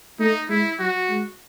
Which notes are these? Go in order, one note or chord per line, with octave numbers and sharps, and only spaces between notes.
A3 D#4
G#3 E4
F#3 F#4
G#3